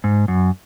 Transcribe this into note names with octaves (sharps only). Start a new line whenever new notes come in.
G#2
F#2